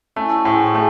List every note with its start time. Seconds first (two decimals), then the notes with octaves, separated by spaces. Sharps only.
0.16 A3 C#4 E4
0.31 D#4 F#4
0.45 A2 G#4 C5
0.74 A3 G#4 C5